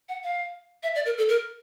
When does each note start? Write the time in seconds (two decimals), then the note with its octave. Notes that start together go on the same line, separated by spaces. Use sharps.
0.09 F#5
0.24 F5
0.83 E5
0.95 D5
1.06 A#4
1.18 A4
1.29 A#4